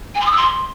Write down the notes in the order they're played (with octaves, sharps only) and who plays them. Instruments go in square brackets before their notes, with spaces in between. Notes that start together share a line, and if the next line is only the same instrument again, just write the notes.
[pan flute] G#5
C6
D#6
E6
C6